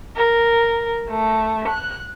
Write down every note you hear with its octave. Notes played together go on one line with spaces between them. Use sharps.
A#4
A3
F#6